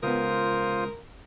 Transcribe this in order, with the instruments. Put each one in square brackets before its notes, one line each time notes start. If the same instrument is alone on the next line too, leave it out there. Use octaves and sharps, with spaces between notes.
[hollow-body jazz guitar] C#2 B3 [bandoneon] F4 C5 D#6 [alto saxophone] A#4